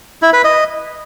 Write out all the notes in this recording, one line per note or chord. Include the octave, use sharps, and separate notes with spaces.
E4
B4
D#5